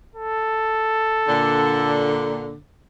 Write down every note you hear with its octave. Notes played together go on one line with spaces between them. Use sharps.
A4
A#2 D3